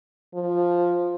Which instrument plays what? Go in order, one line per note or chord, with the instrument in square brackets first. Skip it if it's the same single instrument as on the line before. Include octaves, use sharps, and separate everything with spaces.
[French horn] F3